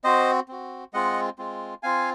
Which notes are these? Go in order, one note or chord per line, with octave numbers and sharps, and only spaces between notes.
C4 F#4 C5 D#5
C4 F#4
G#3 C4 F4 D#5 F#5
G#3 C4 F4
C4 F4 F5 G#5